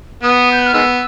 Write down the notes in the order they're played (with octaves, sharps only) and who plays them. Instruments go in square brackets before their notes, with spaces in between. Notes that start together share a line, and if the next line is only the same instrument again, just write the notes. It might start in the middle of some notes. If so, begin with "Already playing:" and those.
[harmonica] B3 [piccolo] D#6
[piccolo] G6
F#6
F6
[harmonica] D#3 G#3 B3 [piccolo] E6